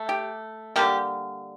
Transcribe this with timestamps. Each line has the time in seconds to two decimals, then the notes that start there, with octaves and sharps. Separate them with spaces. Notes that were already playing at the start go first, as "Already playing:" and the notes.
Already playing: A3
0.09 G4
0.76 D3 G3 A#3 G4